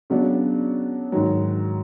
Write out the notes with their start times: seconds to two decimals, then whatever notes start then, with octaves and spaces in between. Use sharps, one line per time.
0.10 C#3 F#3 B3 D4
1.12 G#2 D#3 F#3